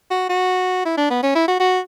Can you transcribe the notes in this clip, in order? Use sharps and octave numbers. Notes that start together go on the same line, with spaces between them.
F#4
F#4
E4
D4
B3
C#4
E4
F#4
F#4